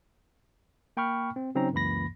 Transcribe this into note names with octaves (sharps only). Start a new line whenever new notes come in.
A#3 G5 B5 C#6 F6
C4
C#3 F#3 C4 C#4 D#4 A#5
C#2 F#2 E3 A#3 B5 A#6